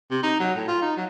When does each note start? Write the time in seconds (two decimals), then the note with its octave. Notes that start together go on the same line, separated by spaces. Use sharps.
0.11 C3
0.23 D#4
0.40 F#3
0.55 A2
0.68 F4
0.82 D#4
0.96 F#3